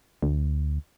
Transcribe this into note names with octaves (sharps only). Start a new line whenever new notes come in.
D2